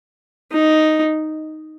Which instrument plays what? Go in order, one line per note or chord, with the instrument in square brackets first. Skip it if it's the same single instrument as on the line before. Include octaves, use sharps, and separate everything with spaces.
[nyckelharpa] D#4